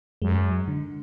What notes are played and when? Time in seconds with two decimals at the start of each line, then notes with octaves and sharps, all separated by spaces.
0.22 F#2 G#3
0.68 D3